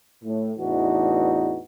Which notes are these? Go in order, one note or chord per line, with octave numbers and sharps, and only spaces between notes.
A2
E2 A2 E3 D4 D#4 F#4